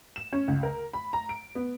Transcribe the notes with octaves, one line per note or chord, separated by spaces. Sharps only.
E7
C#4
C#2
A#4
B5
A#5
D7
B3